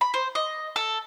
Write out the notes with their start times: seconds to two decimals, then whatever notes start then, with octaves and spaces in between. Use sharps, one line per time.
0.01 B5
0.14 C5
0.35 D#5
0.76 A4